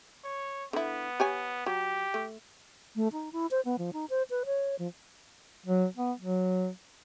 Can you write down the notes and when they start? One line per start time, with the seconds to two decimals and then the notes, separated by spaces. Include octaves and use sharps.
0.24 C#5
0.73 D3 B3 E4
1.20 G4 C#5 G#5
1.66 F#3 G4
2.14 A3
2.96 A3
3.12 D#4
3.32 E4
3.51 C5
3.65 B3
3.78 F3
3.93 D#4
4.10 C5
4.30 B4
4.46 C#5
4.79 F3
5.66 F#3
5.97 B3
6.19 F#3